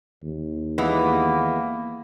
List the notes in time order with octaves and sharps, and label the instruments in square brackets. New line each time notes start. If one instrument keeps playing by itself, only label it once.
[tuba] D#2
[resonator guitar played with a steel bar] E3 G#3 B3 [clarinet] A#3